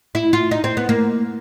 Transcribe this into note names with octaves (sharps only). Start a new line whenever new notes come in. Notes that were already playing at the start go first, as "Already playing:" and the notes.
E4
F4
D#4
C4
B3
A#3